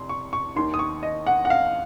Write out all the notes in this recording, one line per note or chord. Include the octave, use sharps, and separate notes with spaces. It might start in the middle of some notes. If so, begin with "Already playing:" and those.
Already playing: F1 C3 C6
C#6
C#6
D#2 D#3 C6
D#6
C#6
D#5
F#5
F#5
F5